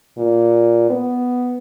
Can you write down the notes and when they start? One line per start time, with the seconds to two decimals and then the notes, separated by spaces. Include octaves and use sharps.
0.18 A#2
0.90 B3